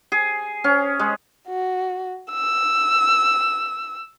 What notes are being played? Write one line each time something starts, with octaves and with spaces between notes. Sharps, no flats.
G#4
C#4
G#3
F#4
E6